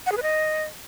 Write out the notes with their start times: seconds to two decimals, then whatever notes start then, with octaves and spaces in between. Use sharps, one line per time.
0.06 F#5
0.12 G#4
0.17 B4
0.23 D#5